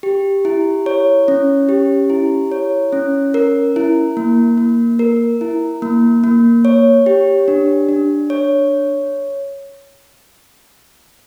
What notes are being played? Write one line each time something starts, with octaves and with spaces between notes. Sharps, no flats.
G4
E4
C#5
C#4
G4
E4
C#5
C#4
A#4
E4
A#3
A#3
A#4
E4
A#3
A#3
C#5
G4
D4
D4
C#5